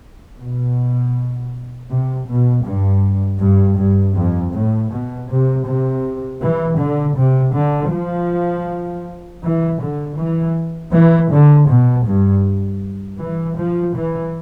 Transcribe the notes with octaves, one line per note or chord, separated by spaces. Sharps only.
B2
C3
B2
G2
G2
G2
F2
A2
B2
C3
C3
E3
D3
C3
D3
F3
E3
D3
E3
E3
D3
B2
G2
E3
F3
E3